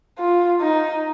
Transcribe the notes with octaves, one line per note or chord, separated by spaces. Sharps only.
F4
D#4